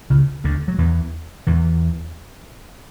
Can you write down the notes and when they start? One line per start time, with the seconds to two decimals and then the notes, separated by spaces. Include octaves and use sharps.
0.10 C#2 C#3
0.44 D2 D3
0.68 F#3
0.78 E2 E3
1.47 E2 E3